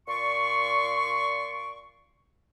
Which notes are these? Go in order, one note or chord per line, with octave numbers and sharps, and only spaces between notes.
A#2 D5 C6 C#6